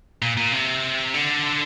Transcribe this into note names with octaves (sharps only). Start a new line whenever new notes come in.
A#2
A#2
C3
D3